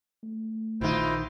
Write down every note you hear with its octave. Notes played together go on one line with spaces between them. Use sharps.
A3
A#1 B2 D#3 E4 F4 C5